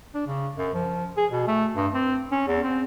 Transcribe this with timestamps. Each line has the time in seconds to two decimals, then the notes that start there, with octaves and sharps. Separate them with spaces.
0.14 D4
0.27 C#3
0.57 F#2
0.74 F3
1.17 G#4
1.32 B2
1.47 A3
1.76 G2
1.94 C4
2.31 C#4
2.47 E2
2.63 C4